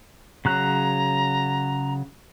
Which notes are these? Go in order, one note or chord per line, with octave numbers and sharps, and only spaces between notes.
C#3 F#3 A#5 F#6